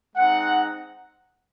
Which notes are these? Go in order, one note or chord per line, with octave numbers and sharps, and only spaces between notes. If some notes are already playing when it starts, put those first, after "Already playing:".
G#3 C4 D#4 F#5